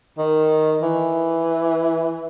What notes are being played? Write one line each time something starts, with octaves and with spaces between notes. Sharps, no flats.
D#3
E3